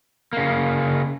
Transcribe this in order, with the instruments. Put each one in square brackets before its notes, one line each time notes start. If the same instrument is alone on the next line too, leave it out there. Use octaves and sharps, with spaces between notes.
[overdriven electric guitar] C#3 A#3